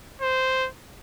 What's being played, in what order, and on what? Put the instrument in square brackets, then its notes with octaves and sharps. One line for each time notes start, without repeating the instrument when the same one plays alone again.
[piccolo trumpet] C5